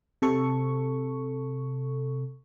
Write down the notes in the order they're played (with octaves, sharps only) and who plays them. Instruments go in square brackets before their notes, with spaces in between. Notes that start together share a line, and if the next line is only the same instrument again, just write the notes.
[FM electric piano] C3 A4 C#6